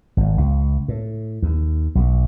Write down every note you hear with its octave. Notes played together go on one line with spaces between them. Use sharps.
G#1
C#2
A2
D#2
B1